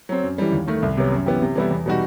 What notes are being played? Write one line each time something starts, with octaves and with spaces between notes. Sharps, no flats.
F#3 C4
F#2
E3 G3
D#2
D#3 A3
C2
C3 F#3 B3
F#2
E3 B3 E4 G4
C3
E3 G3 B3 E4
E2
B2 G3 D#4 F#4